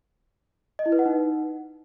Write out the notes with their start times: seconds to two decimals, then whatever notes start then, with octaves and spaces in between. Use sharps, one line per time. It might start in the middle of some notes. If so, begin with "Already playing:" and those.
0.79 D#5
0.86 E4
0.92 B4
0.99 F#5
1.06 D#4